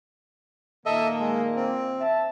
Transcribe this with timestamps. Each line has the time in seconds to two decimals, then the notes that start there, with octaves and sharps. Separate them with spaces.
0.86 A#2 D#3 A#3 A4 D#5 E5
1.19 G#3
1.56 C4
1.99 E5 A5